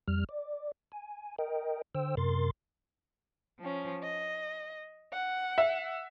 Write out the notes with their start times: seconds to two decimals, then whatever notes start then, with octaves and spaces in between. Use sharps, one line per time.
0.08 F2 G3 F6
0.29 D5
0.92 G#5
1.39 A#4 D#5 G5
1.95 D3 C5 G5 E6
2.17 F#2 C3 A#4 C6 A6
3.59 F3 C#4
4.04 D#5
5.12 F#5
5.58 E5